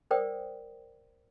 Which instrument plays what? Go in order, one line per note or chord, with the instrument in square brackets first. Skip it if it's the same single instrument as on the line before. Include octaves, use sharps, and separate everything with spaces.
[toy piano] A#4 C5 D5 G5 D#6